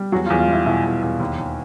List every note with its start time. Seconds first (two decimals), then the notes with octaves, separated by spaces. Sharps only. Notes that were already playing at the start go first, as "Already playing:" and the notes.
Already playing: G3
0.12 E2 F#3 F#4
0.26 F4
0.30 E2
0.39 F4
0.47 G3
0.53 E4
0.66 B2 E4
0.85 E2
1.02 E2
1.20 D#2
1.38 D#2